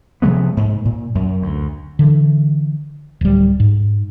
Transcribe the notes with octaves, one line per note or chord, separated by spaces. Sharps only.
C3 F3 G#3 B3
G#2
A#2
F#2
D2
D3 E3
D1 G3
G#2